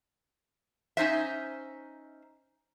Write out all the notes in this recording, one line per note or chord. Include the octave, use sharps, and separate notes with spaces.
C#4 D#4 C5 E5